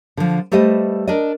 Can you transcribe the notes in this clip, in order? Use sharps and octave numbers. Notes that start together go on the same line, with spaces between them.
D3 F3
G3 A3 G4 B4 C5 D#5
D4 A#4 D5 D#5